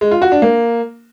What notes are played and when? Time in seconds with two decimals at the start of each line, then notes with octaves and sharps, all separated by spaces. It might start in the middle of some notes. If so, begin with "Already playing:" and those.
0.01 G#3
0.11 F4
0.22 F#4
0.32 D4
0.42 A#3